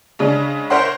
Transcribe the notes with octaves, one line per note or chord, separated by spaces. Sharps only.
C#3 G#3 D4
A#4 C5 C#5 E5 F#5 C6